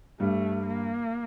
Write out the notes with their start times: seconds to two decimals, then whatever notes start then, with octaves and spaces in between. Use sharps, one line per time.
0.20 G2 G3 A3
0.66 A#3